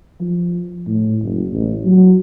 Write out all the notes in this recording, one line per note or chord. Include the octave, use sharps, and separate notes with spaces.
F3
A2
F#1
A1
F#3